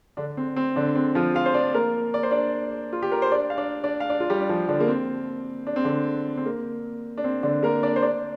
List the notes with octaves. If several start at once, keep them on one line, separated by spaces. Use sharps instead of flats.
D3 D4
C4
C4
D3 D4
C4
F3 F4
F4 F5
C5
D4 D5
A#3 A#4
D5
C5
D4 D5
F4
G4
A#4
C5
D4 D5
F5
D4 D5
D4 D5
F5
D4 D5
F4
G3 G4
D4
F3 F4
D3 D4
A#3
C4
D4
C4
D3 D4
C4
A#3
D4
C4
D3 D4
A#3 A#4
D4 D5
C5
D4 D5